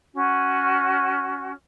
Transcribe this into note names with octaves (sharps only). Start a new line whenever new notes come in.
C#4 F#4